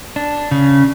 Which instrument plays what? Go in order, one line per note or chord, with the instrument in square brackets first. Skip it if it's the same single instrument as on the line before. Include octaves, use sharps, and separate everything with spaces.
[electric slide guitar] D4
C#3